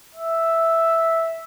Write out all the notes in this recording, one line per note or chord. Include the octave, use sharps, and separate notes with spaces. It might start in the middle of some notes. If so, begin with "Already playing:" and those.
E5